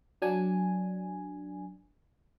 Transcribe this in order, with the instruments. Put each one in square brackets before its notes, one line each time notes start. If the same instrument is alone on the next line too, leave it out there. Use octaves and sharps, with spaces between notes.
[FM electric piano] F#3 D4 G#5